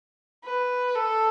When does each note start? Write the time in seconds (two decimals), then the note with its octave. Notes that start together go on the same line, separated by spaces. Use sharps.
0.44 B4
0.95 A4